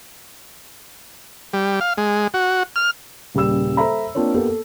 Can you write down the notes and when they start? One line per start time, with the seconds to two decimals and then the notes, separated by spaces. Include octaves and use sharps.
1.53 G3
1.81 F5
1.98 G#3
2.34 F#4
2.76 F6
3.35 D#1 C#3 G3 G4 E6 E7
3.77 A4 C5 E5 A#5 B5
4.15 A#3 C4 D4 F4 A#4 C#5
4.34 A#3 B3 G4 A4
4.46 A4